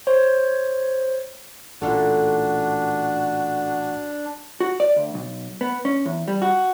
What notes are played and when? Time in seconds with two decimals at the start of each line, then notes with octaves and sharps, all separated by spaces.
0.07 C5 C#5
1.82 A1 A#2 D4 F4 F#4 A4
4.60 F#4
4.80 D5
4.96 D2
5.14 B1
5.61 B3
5.85 C#4
6.05 E2
6.28 G3
6.42 F#4